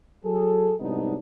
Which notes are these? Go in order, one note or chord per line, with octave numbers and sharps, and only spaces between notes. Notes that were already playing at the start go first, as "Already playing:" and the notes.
F#3 G#4 A4
C2 G#2 F#3 B3 D4 D#4